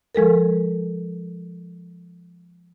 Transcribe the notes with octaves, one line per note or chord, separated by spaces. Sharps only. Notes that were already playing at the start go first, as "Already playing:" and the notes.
F3 G#3 A4 A#4